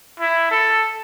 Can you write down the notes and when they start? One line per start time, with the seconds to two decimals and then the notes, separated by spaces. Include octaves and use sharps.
0.20 E4
0.51 A4